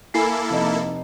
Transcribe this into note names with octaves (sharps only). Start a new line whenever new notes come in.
A#3 E4 A4 G#5 B5 C7
F1 D#4